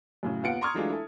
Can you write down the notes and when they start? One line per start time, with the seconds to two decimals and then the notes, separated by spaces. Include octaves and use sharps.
0.23 F#2 A2 C#3
0.43 D#2 B3 F4 F#5 C#7 D7
0.61 A#5 C6 C#6 D#6 F6 G#6
0.74 E3 F#3 G#3 A3 D4 F4
0.89 E4 A4